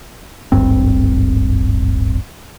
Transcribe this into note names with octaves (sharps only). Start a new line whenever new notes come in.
D1 G#1 G2 C4